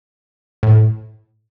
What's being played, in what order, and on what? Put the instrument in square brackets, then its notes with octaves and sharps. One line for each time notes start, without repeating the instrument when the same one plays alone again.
[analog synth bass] A2